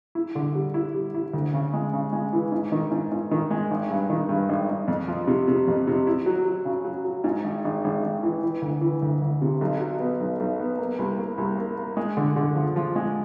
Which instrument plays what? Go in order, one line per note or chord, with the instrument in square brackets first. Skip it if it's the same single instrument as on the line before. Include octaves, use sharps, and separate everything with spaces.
[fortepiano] E4
D3
G3
E4
G3
E4
D2
C#3
G#3
C#3
G#3
E3
G#2
D#3
G#2
G#2
D#3
G#3
G#1
G2
D#3
G2
G#1
G#1
F2
F3
C3
C3
F2
C3
E4
F#3
F#3
C#3
F#3
F#3
G#2
G#1
G#1
G#1
G#1
E3
E3
D2
E3
D2
D2
C3
B1
F#3
B3
B1
B1
B3
A#3
C2
A#3
C2
A#3
A#3
G#3
D3
D3
F3
F3
G#3